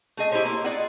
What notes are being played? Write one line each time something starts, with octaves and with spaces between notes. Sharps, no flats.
A3 G#4 D#5
E4 G4 G#4 C5 C#5
A#3 E4
F4 G#4 D5 D#5 F#5